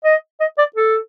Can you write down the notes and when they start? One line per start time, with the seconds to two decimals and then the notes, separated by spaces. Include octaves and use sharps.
0.04 D#5
0.40 D#5
0.58 D5
0.76 A4